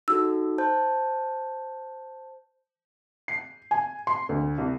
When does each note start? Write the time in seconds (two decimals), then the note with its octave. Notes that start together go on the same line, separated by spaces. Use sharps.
0.08 D#4 F#4 A4 E6
0.58 C5 A5 G6
3.28 C7
3.71 G#5
4.07 C6
4.29 D2
4.58 C2